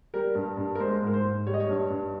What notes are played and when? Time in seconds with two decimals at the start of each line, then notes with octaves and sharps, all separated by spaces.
0.14 G3 A#4
0.35 G2
0.57 G2
0.75 A#4
0.80 G#3 C5
1.02 G#2 A#4
1.13 C5
1.24 G#2
1.46 G3 C#5
1.54 D#5
1.60 C#5
1.69 G2
1.90 G2